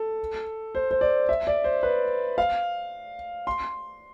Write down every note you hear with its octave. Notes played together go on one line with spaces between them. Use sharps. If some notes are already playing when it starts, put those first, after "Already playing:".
Already playing: A4
C5
C5
D5
E5
D5
C5
B4
F5
C6